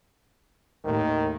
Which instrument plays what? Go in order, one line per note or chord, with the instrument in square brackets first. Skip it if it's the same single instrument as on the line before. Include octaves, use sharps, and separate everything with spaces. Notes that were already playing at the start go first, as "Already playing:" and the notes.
[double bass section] D#2 A2 [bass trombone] D#3